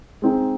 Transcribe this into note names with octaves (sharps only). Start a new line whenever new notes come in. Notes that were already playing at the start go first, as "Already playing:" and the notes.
G#3 C4 D#4 G#4